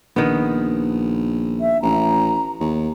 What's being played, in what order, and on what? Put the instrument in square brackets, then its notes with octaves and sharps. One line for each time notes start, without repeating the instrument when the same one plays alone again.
[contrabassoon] A#1 [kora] D#3 B3
[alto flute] E5
[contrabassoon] A1 [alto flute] A#5
[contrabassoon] D#2